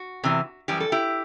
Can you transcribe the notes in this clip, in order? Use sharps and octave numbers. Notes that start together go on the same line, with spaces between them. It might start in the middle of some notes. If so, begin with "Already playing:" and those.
Already playing: F#4
E2 C3 E3
F#2 E3 G3 G4
A4
E4 G4